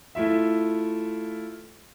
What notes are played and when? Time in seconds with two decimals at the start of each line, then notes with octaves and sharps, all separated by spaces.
0.15 A3 E4 F4 E5